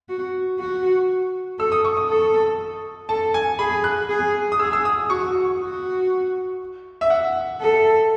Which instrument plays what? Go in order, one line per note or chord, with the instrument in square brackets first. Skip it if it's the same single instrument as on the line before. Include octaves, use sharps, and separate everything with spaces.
[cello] F#4
F#4
[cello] A4 [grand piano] E6
[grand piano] D#6
C#6
D#6
[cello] A4
[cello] A4 [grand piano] A5
[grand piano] G#5
[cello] G#4 [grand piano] B5
[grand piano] F#6
[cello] G#4
[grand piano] D#6
[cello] G#4 [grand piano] E6
[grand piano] E6
D#6
[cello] F#4 [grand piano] C#6
[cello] F#4
[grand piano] E5
F#5
[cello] A4